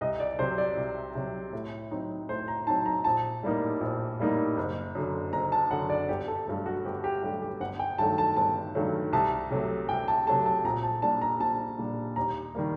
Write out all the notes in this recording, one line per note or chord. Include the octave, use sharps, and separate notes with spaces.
C2 D#5
D5
C3 F#3 C5
D5
C2
C3 F#3
A2
F#3 C4 D#4
A2 C5
A#5
F#3 C4 D#4 A5
A#5
A#1 A5
A2 G3 A#3 D#4
A#1
A2 G3 A#3 D#4
F#1
F#2 D3
F#1 A#5
A5
F#2 D3 F#5
D5
G1 G4
A4
G2 F#3 A3 A4
F#4
G1 G4
G4
G2 F#3 A3 G4
G4
G1 F#5
G5
G2 D#3 F#3 A3 A5
A5
G1 A5
G2 D#3 F#3 A3
C2 A5
C3 F#3 A3
C2 G5
A5
C3 F#3 A3 A5
A5
A#1 A#5
A5
A#2 G3 D4 A5
A#5
A#1 A5
A#2 G3 D4
D#2 A#5
D#3 G3 A#3